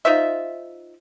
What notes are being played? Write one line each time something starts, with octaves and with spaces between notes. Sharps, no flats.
D#4 F4 C5 E5